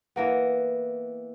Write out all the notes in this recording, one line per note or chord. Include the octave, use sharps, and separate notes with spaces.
E3 A#3 B3